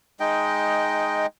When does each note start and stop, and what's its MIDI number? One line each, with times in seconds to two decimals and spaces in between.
0.20 1.26 56
0.20 1.26 63
0.20 1.26 75
0.20 1.26 79